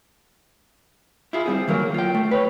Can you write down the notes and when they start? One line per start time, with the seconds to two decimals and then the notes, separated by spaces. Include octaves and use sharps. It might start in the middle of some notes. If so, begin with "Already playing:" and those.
1.33 E4 F4 G#4
1.46 G3 C4 G#4
1.68 D#3 F#3 A#3 A#4
1.94 F4 G5
2.14 A3
2.31 B4 C#5